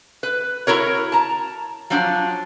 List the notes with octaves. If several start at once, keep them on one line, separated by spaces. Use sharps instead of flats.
B4
E4 F#4 A#4 C#5
A5 A#5
F3 F#3 C#4 D4